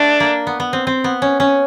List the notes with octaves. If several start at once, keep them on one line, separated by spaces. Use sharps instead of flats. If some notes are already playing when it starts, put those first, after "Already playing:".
Already playing: A3 D4
A#3
B3
B3
C4
C4
B3
C#4
C#4